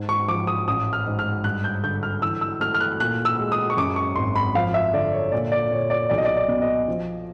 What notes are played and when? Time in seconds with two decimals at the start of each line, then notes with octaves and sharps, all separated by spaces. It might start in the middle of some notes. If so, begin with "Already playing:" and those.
Already playing: G#2
0.09 C#6
0.28 F3 D6
0.47 D#6
0.67 A1 D#6
0.93 F6
1.07 G#2
1.19 F6
1.44 G2 F#6
1.64 G6
1.83 D3 G6
2.03 F6
2.22 E3 E6
2.41 E6
2.61 A3 F6
2.74 F6
2.80 F#6
3.00 A#2 F#6
3.25 E6
3.39 G#3
3.52 D#6
3.70 C#6
3.77 F#2 D6
3.96 C#6
4.16 G#1 C6
4.35 B5
4.55 F3 F5
4.74 E5
4.94 D3 D5
5.13 C#5
5.32 A#2 D5
5.52 D5
5.71 A#2 C#5
5.90 D5
6.10 B1 D5
6.18 D#5
6.25 D5
6.36 D5
6.48 B2
6.62 D#5
6.88 F3